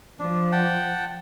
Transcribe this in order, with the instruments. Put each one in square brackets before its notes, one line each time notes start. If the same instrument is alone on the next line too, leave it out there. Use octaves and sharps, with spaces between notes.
[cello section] F3 [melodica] D4
[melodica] F#5 G5 A5